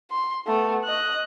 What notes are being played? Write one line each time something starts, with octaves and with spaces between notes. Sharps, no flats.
C6
A3 B3
D#5 F#6